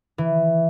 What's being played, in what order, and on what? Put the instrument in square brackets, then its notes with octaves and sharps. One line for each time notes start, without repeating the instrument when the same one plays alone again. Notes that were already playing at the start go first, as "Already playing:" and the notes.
[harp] E3